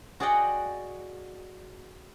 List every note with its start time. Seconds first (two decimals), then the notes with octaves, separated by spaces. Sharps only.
0.20 F#4 G#4 D5 D#5 F#5 G5